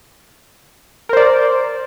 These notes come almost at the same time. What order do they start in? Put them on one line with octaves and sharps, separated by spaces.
A#4 C5 D5